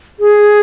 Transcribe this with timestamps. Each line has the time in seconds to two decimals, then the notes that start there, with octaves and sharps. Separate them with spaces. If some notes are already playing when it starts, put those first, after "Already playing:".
0.20 G#4